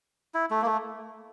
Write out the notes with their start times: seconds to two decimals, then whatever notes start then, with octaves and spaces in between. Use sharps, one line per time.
0.34 E4
0.50 A3
0.62 A#3
0.66 A3